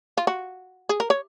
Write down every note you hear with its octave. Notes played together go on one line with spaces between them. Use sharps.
F4
F#4
G#4
A#4
C#5